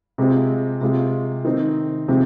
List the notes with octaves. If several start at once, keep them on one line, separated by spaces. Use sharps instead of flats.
C3 G#3 C4 F4
C3 G#3 F4
D#3 C4 D#4
C3 F3 G#3 C4